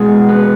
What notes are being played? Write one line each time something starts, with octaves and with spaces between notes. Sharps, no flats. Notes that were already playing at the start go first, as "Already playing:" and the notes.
Already playing: B2 G#3
B3